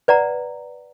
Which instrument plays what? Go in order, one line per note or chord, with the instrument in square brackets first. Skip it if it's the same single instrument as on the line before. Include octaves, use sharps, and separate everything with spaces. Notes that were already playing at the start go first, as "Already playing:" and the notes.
[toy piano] B4 D5 F#5 A#5